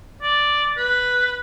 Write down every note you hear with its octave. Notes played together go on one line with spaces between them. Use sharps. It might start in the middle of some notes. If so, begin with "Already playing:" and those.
D5
B4